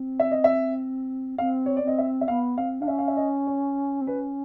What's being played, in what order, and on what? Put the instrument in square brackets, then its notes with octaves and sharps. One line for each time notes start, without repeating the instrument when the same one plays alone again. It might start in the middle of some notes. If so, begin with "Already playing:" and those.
Already playing: [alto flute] C4
[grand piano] E5
D#5
E5
[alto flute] C4 [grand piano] F5
[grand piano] C#5
D5
[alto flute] C4 [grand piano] D#5
[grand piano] E5
E5
[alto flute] B3 [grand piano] F5
[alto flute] C4 [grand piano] F5
[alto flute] D4 [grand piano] F5
[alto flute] C#4 [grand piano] E5
[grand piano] F5
E5
D#5
C#5
[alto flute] C4
[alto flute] C#4 [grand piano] B4